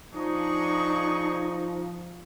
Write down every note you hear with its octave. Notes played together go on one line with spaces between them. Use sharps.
F3 D4 D#4 G#4 C#6